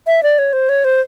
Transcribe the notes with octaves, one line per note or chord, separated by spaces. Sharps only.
E5
D5
C#5
C5
C#5
C5